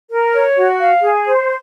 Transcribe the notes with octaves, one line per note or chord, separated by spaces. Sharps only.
A#4
C#5
F#4
F5
G#4
C5